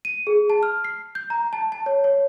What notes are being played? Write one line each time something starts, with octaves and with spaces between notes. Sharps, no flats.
D#7
G#4
A5
F6
C7
G6
A#5
A5
A5
C#5
C#5